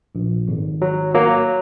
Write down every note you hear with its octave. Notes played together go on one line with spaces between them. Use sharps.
A#1
G#1
F#3
F#3 A#3